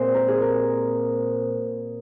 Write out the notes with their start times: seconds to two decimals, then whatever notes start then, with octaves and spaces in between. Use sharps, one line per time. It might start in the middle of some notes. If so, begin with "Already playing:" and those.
Already playing: A#2 G#3 C4 C5
0.14 A#4
0.28 G#4
0.41 A#4